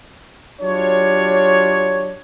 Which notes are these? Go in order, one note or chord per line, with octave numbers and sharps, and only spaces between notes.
F#3 D4 F4 G4 C#5